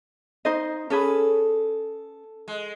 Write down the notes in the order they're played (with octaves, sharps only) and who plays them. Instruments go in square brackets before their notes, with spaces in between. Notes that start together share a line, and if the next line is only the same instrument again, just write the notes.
[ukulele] D#4 C5 D#5
[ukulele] C#4 G#4 B4 [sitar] A4
[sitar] G#3